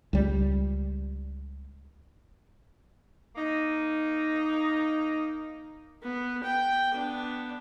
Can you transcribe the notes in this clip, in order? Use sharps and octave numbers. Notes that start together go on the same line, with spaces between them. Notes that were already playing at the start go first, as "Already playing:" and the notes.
C#2 G3
A#3 D#4
B3
G5
B3 D4